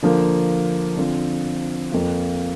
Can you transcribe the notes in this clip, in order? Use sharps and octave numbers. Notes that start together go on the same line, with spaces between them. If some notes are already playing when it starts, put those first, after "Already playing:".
D3 F3 A#3
D3 F3 C4
F2 F3 A#3 F4